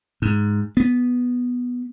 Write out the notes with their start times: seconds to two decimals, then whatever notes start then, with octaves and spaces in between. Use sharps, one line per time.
0.22 G#2
0.77 B3